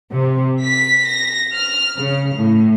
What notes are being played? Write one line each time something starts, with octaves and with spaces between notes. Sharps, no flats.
C3
B6
A#6
F6
C#3
A2